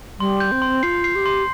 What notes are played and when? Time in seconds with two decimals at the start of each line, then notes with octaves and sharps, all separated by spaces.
0.19 G3 C6
0.40 G6
0.52 C4
0.62 C6
0.83 F4 C7
1.04 C7
1.15 G4
1.26 C6